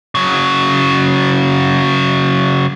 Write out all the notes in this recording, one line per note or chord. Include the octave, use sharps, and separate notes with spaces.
C#3 F#3